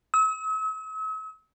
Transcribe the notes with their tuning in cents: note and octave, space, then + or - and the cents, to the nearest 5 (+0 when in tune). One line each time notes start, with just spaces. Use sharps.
E6 -45